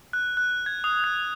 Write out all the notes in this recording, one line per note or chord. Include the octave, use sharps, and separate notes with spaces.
F#6
F#6
G#6
D#6
F#6